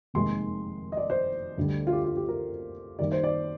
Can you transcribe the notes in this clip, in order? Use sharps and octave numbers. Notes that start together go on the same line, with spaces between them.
F1 D#2 D#3 G#3 C6
D#5
D5
C5
D2 D3 G3
F4
G4
F4
G4
A#4
D#2 D#3 G3 D5
C5
D5